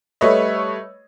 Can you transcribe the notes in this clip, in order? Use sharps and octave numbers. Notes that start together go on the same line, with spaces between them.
G3 A3 B4 C#5 D#5